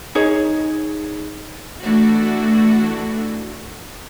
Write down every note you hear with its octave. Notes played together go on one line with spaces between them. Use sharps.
D#4 G#4 C#5
E3 A3 D4 E4 F#4 A4